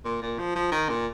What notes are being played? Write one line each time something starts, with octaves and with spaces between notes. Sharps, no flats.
A#2
A#2
F3
F3
D#3
A#2